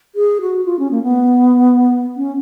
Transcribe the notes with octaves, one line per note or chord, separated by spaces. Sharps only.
G#4
F#4
F4
C#4
A#3
B3
C#4